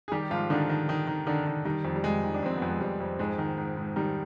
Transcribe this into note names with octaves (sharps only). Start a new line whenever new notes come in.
G#4
D#3 G3 G4
G#2 F3 F4
D3 D#3 D4
D#3
D#3
D#3
D3 D#3 D4
D#3
D#3 G3
F2
G3
F2 G#3
D#3
D4
F2 C4
F2 B3
G#3
F2 G3
F2
G#2 G#3
D#3
G#2
G#2
D#3 G3